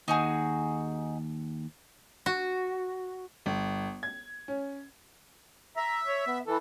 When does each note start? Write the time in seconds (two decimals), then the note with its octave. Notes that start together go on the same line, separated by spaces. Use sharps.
0.08 D#2 D#4 F#4 G#4
2.26 F#4
3.46 G1
4.03 G#6
4.48 C#4
5.77 E5 A#5
6.05 C#5
6.27 B3
6.47 E3 A4